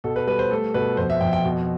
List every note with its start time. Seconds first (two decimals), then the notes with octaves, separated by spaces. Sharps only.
0.04 B2 A4
0.16 B4
0.27 G3 B4
0.39 C5
0.51 A3 A4
0.74 B2 B4
0.97 F2 C5
1.10 E5
1.21 F2 G5
1.33 G5
1.45 B2